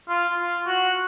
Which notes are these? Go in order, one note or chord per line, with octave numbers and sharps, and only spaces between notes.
F4
F4
F#4